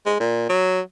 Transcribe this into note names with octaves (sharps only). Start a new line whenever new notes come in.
G#3
A#2
F#3